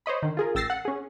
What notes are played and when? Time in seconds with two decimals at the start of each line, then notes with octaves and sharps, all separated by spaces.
0.06 C5 C#5 D#5 B5
0.22 D3 D#3
0.37 F4 G#4 A#4
0.55 A1 G5 E6 A6 A#6 C7
0.70 F#5
0.85 C#4 G#4